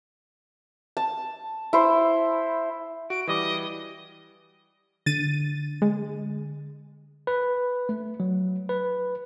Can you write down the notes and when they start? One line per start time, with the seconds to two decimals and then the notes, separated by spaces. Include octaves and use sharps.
0.97 A5
1.73 E4 C5
3.10 F#4 D7
3.27 E3 G3 D#5 D6
5.06 D3 A6 D#7
5.82 G#3
7.27 B4
7.89 A3
8.20 F#3
8.69 B4